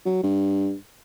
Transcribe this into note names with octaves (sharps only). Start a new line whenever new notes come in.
F#3
G2